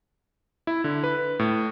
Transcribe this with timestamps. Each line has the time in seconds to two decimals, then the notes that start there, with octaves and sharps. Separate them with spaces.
0.67 E4
0.84 D3
1.03 B4
1.39 A2